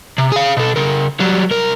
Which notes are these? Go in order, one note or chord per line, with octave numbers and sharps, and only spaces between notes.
C3
G#4 F5
B2 A4
C#3 A#4
F#3 G3
C2 A#4